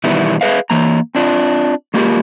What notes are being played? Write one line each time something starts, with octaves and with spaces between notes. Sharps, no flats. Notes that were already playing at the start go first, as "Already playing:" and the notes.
B2 D#3 E3 G3 B3 E4
G#4 B4 E5 F5
E3 A#3 A#5
C4 D4 F4
G#3 A#3 F4 G4 A#4